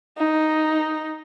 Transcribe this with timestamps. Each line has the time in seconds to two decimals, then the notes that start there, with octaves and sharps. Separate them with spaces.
0.18 D#4